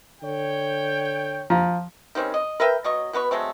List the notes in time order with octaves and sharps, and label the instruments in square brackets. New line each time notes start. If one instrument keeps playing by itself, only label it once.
[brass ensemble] D3 C#5 G5
[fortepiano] F3 A#5
[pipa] D#3 G3 C4 C#4
D#5
A#4 B4 E5 G5
B2 F#3 D#5 C#6
B2 B3 B4 C#6
F#3 G#3 A3 C4